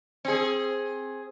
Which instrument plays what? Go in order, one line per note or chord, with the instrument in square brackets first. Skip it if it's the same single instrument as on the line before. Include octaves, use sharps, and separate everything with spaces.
[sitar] C4 G#4